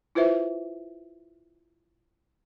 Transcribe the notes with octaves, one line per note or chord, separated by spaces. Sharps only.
E4 F4 B4 C5 E5